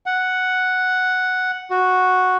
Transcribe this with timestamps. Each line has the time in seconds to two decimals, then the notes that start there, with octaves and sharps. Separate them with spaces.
0.06 F#5
1.71 F#4